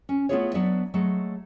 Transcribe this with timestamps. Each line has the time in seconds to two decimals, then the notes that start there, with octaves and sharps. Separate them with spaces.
0.09 C#4
0.29 A3 B3 E4 F4 G#4 C#5
0.54 F#3 B3 D4 D5 E5
0.94 F#3 G#3 A3